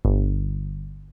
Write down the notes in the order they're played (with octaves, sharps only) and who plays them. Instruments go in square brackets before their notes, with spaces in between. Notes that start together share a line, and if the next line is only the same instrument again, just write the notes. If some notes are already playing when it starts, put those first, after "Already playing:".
[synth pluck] G1